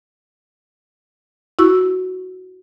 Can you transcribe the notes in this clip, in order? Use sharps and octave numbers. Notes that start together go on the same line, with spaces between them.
E4 F#4 C#6 E6